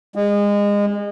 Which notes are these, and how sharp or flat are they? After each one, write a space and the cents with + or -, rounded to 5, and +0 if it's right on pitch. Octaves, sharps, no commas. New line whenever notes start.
G#3 -30